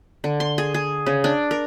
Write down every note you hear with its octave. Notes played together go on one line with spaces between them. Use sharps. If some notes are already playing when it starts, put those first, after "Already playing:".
D3
C6
G#4
G#4
C#3
D4
A#4